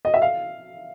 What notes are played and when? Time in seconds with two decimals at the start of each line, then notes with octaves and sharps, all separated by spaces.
0.05 D#5
0.14 E5
0.22 F5